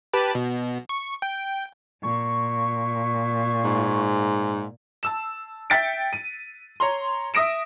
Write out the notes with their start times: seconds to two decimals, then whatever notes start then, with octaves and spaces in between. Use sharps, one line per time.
0.13 G4 B4 A5
0.35 B2
0.89 C#6
1.22 G5
2.03 A#2 C#6
3.64 G#2
5.03 A5 E6 E7
5.70 E5 G5 A6 B6 C#7 D7
6.13 D#7
6.80 C#5 A#5 C6
7.34 E5 D#6 A#6 D7 E7